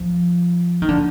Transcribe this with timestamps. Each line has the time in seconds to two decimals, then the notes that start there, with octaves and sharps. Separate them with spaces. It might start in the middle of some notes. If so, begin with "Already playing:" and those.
Already playing: F3
0.82 D#3
0.89 D3